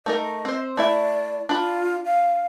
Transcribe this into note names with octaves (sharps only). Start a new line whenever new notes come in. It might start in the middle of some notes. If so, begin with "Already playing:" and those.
A3 D#4 A#4 D#5
C4 C5
A3 E4 D5 E5
D4 F4 B5
F5